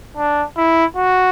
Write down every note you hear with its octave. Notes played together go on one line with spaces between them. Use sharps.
D4
E4
F#4